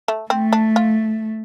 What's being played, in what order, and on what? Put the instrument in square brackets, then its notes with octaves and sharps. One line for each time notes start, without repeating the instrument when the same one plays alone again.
[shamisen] A3
[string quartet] A3 [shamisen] C4
[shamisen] D4
F4